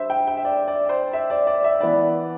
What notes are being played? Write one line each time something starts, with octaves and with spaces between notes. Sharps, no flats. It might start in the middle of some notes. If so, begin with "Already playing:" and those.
Already playing: D3 G3 C5 E5
G5
G5
E5
D5
D5
C5
E5
D5
D5
E5
E3 B3 E4 D5